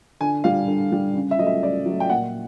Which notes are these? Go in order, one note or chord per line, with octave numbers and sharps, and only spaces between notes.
D3 G#5
G3 F5
D3
G3
C#3
E5
F#3 A3 D#5
E5
C#3 D5
F#3 A3
G5
A#2 F#5